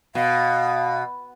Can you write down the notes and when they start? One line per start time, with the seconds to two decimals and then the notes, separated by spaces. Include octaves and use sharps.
0.15 B2 F5